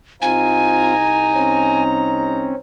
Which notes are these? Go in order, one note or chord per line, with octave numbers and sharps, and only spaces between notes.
C2 C4 D#4 F4 G#5 A#5
C4 C#4